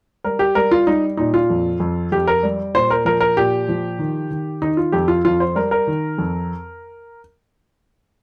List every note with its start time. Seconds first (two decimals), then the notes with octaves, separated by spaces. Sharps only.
0.24 G3 A#4
0.39 G4
0.55 G3 A#4
0.71 F4
0.87 G3 D#4
1.17 A#2 D#4
1.34 F4
1.50 F2
1.80 F2
2.12 F2 G4
2.27 A#4
2.43 G3
2.74 A#2 C5
2.90 A#4
3.05 F3 A#4
3.20 A#4
3.37 A#2 G4
3.69 F3
3.99 D#3
4.31 D#3
4.62 D#3 D#4
4.77 F4
4.92 F2 G4
5.08 F4
5.25 F2 F4
5.40 C5
5.55 G3 A#4
5.71 A#4
5.87 D#3
6.18 F2